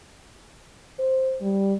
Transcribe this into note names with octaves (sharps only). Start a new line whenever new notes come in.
C5
G3